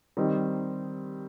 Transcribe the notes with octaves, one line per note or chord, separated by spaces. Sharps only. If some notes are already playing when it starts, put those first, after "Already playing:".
D#3 G3 C4 D#4